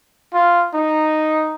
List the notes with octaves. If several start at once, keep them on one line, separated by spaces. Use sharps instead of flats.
F4
D#4